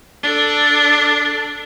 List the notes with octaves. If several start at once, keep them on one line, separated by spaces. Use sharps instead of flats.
D4 A4